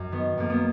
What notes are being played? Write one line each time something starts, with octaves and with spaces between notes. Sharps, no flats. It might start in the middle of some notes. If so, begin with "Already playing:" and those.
Already playing: F#2
D#3 B3
F#2 A#3
B3